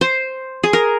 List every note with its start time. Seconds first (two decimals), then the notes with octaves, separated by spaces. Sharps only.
0.01 C5
0.63 G#4
0.73 A#4